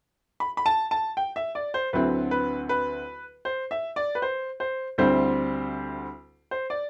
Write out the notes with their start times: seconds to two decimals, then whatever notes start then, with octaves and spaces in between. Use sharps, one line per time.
0.40 B5
0.57 B5
0.66 A5
0.91 A5
1.17 G5
1.36 E5
1.55 D5
1.74 C5
1.93 D2 D3 F#3 C4 E4 B4
2.31 B4
2.69 B4
3.45 C5
3.71 E5
3.96 D5
4.15 B4
4.22 C5
4.60 C5
4.98 D2 D3 G3 C4 E4 C5
6.51 C5
6.70 D5